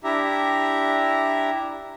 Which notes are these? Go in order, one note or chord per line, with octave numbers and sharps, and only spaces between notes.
D4 E4 G4 E5 A#5